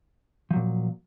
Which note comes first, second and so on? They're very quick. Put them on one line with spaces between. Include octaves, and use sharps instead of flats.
F3 F#3 A#2